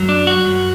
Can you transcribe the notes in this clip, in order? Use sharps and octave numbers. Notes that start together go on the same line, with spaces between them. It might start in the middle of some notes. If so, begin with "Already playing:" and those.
Already playing: F#2 F#3
D4
F#4
F#2 F#3